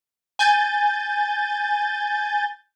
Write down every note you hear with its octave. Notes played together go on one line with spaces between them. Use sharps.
G#5 G6 A6